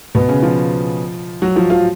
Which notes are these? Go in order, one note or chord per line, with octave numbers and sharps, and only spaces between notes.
B2 B3
C#3 C#4
F3 F4
F#3 F#4
F3 F4
F3 F4